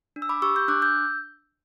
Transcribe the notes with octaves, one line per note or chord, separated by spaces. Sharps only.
D4
E6
B5 D6
G4 C#6 E6
E6 G6
D4 D6 F#6
E6 G6